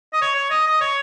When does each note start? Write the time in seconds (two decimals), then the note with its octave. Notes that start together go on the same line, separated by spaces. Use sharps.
0.13 D#5
0.21 C#5
0.35 C#5
0.50 D#5
0.67 D#5
0.81 C#5